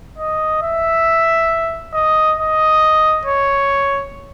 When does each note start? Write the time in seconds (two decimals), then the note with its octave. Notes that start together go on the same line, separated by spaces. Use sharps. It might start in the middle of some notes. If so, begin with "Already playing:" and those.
0.18 D#5
0.62 E5
1.93 D#5
2.38 D#5
3.25 C#5